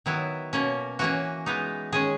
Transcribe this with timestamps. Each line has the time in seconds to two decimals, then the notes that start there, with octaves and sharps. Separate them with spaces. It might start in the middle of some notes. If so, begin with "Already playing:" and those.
0.06 D#3 F#3 B3 E4
0.53 B2 A#3 C#4
0.99 E3 A#3 C#4 F#4
1.46 E3 G#3 B3 D#4
1.92 D#3 G#3 C#4 G#4